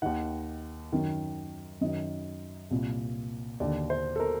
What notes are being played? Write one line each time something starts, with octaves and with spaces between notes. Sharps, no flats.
D#2 D#3 F#5
F#2 D#3
F#2 D#3 D#5
C2 A#2
D#2 D3 D5
C5
A4
A#4